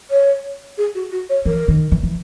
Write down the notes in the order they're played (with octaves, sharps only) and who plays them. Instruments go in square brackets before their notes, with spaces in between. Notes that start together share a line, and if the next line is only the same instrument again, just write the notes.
[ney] C#5
G#4
F#4
F#4
C#5
[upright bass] E3 [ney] A#4
[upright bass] D#3
E3
E3